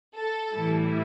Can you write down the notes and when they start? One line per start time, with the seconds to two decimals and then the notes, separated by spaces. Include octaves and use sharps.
0.17 A4
0.53 A2 E3 G3 E4